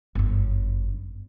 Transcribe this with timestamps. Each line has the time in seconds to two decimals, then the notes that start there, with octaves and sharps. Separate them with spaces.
0.15 G1 F#2